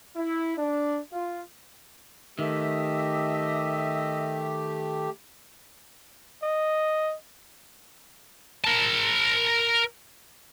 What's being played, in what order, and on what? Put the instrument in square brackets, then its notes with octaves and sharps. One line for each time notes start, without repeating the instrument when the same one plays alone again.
[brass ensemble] E4
D4
F4
[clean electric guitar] D#3 [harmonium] A3 G4 [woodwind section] D#5 E5
[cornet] D#5
[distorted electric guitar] A#4 A5